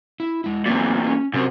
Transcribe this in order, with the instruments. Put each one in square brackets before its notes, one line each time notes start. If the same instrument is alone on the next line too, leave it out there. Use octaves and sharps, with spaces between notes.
[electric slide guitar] E4
G#3 E4
[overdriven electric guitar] E2 A#2 [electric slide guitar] F#3 A3 C4
[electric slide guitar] C#4
[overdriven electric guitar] F#2 [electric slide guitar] C3 C4 C5